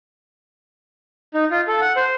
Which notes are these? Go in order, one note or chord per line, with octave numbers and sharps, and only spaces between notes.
D#4
F4
A4
F#5
C5